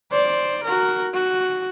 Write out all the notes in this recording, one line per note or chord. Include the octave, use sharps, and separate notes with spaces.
C5 D5
F#4 A#4
F#4